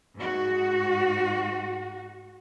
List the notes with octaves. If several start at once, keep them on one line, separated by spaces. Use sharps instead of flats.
G#2 F#4